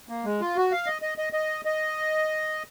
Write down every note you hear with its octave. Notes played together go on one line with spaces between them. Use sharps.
A#3
G#3
F4
F#4
F5
D#5
D#5
D#5
D#5
D#5